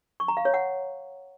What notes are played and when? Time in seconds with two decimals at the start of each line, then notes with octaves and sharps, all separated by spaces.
0.20 C#6
0.28 A#5
0.37 F5
0.45 C#5
0.54 F#5